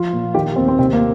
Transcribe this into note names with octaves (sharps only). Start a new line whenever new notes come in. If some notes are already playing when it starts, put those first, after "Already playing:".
Already playing: F3 F4
A#2
D#3 G4
D#2 C4
C4
C3 C4
A#3